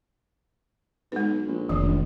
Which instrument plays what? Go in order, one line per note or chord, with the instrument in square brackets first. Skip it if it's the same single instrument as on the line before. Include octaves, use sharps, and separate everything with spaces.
[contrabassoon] B1 [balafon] G#3 B4
[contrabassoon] A#1
[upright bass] F1 [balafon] D#3 E3
[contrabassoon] C#2